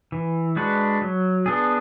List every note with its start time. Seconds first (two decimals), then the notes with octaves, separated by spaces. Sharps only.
0.12 E3
0.56 G#3 D4 F#4 B4
1.02 F#3
1.46 B3 D4 G#4